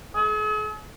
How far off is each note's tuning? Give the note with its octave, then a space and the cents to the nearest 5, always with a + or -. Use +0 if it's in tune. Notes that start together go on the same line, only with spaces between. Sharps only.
G#4 +45